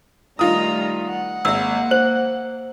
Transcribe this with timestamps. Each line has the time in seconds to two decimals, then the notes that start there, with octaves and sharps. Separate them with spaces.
0.39 D#3 G3 A3 D#4 F4 A#5 D#6
1.09 F#5
1.45 G#1 A#3 E5 E6
1.91 C5 F#7